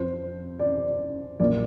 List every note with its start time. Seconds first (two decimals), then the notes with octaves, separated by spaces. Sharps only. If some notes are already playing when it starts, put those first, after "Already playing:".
Already playing: F2 F3 C4 C5
0.59 D5
1.40 A#1 A#2 A#3 D5